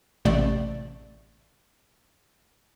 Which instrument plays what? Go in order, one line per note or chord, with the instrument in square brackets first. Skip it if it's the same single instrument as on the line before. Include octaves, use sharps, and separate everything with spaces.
[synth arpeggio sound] A1 C3 A3 D5